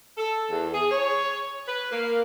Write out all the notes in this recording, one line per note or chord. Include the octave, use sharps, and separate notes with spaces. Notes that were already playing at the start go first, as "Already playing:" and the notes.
A4
E2
G#4
C#5
B4
A#3